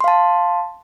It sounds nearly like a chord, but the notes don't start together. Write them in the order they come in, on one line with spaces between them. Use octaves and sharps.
C6 F5 A5